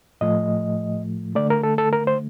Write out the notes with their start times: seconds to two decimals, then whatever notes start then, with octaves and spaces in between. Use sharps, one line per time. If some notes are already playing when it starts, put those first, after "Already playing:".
0.21 A2 F3 A3 D#5
1.35 D3 A3 D5
1.50 A#4
1.63 A4
1.78 A4
1.93 A#4
2.07 C5